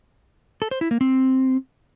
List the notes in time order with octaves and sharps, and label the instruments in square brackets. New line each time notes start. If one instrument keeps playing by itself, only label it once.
[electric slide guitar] A4
C5
E4
A#3
C4